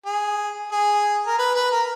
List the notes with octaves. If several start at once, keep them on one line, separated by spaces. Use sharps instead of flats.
G#4
G#4
A#4
B4
B4
A#4